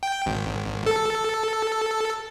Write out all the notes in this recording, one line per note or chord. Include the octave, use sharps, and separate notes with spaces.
G5
G#1
A4